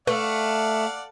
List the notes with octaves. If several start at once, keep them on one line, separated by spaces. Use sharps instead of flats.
A3 B4 D5 F5 F#5